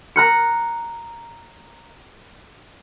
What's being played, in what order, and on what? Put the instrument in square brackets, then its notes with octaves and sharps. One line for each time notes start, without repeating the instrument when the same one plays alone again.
[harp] A#5 F#6 C#7